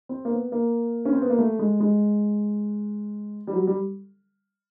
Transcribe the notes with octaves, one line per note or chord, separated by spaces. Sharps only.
C4
A#3
B3
A#3
C#4
C4
B3
A#3
A3
G#3
G#3
G3
F#3
G3